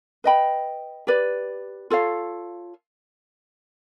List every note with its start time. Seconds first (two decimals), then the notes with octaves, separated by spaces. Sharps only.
0.24 B4 D#5 G5 B5
1.07 G4 B4 D5
1.90 F4 A4 C#5 F5